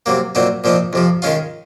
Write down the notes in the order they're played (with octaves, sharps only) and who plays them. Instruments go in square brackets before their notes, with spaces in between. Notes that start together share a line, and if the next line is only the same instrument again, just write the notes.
[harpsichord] C3 F#3 A#3
A#2 F#3 C4 D#4
A#2 F3 C4 D#4
F2 C3 F3
D#3 G#3 C#4 F4